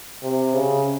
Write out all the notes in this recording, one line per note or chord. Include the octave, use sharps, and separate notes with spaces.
C3
C#3